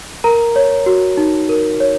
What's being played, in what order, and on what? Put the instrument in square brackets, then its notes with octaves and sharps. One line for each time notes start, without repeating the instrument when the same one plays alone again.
[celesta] A#4 A#5
C#5
F#4
D#4
A#4
C#5